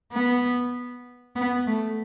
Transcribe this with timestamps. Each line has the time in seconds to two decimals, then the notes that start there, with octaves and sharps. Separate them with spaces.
0.13 B3
1.36 B3
1.67 A3